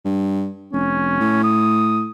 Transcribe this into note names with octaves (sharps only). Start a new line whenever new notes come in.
G2
F1 C#4
A2
D#6